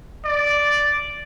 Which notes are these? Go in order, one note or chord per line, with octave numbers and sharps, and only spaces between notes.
D5